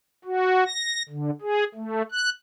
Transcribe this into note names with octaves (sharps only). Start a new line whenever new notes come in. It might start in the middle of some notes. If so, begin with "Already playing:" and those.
F#4
A#6
D3
G#4
A3
F#6